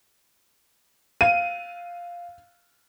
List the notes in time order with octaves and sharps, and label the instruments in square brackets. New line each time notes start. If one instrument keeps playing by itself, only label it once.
[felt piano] F5 [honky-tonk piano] D#7